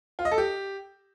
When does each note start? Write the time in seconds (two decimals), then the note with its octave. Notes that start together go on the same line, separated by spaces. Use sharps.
0.19 F4
0.25 D#5
0.31 A4
0.38 G4